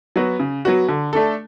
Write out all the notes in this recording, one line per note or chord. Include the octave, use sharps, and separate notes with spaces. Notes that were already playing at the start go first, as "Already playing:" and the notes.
F#3 B3 F#4
C#3
F#3 B3 F#4
D3
A3 D4 A4